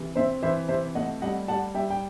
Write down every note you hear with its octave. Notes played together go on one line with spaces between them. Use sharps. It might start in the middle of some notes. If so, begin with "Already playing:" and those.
Already playing: C3 E3
C4 C5 E5
E3 C5 E5
C3 C5 E5
A3 D#5 F#5
G3 D#5 F#5
G3 F#5 A5
G3 E5 G5
G5